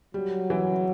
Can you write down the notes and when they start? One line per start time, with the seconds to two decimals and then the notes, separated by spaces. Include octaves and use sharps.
0.14 F#3 G3
0.50 E3